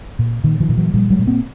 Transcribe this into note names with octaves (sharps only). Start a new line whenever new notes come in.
A#2
A#2 D#3
D#3 F3
A#2
E3 F#3
A#2 F3 G3
F#3 G#3
A#2
A#3 C4